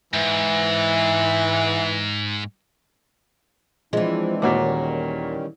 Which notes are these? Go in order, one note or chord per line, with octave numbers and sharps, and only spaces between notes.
G#2 E3
E3 F3 G#3 C4 D4 E4
D#2 A#2 F#4 D6
D#3 G3 C#4